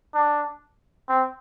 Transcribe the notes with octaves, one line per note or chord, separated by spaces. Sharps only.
D4
C4